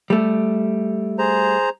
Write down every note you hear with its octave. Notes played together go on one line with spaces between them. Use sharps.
G3 A3
G#4 C5 A#5